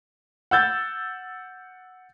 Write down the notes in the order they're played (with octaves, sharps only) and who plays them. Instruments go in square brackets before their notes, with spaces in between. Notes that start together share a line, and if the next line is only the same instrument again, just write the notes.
[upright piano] F#5 E6 G6 A6